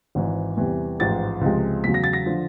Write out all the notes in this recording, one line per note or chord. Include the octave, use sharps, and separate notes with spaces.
G#1 G#2 E3
E2 C3 E3 G3
A1 G#2 F3 G#3 A6
C#2 C3 F3 G#3
E2 C#3 F#3 B6
A#6
A6
A#6
D3 F3